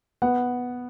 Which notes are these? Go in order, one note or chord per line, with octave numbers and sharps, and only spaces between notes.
B3 F#5